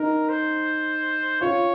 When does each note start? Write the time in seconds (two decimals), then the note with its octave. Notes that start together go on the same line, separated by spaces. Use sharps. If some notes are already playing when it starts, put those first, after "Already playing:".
Already playing: D#4 A#4
0.29 C5
1.41 F4 C#5